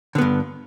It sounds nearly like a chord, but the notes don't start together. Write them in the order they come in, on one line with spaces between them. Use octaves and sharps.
D3 B3 G2